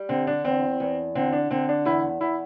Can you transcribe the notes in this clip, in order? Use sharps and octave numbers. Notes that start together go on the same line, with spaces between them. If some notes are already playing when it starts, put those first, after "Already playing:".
Already playing: G3
D3 C4
D4
E2 C4
E2
D3 C4
D4
D3 C4
D4
E2 E4
E2 E4